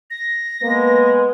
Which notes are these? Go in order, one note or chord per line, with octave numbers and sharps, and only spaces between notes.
A#6
G#3 A#3 B3 B4